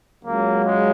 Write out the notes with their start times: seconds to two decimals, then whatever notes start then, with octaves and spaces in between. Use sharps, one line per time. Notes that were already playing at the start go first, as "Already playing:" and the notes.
0.24 C#2 C#3 F#3 A#3
0.63 G#3